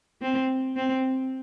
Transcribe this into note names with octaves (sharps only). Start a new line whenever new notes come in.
C4
C4